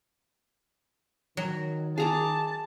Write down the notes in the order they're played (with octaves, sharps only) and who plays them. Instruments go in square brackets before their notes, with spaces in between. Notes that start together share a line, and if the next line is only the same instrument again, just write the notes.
[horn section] D#3 [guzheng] F#3
[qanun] G#4 A#5 D6 [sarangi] A5